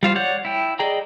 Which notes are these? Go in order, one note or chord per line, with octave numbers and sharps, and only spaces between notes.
G3 F4 C5
C#5 D5 F#5 G6
E4 G5
G#4 D5 D#5 G5 A#5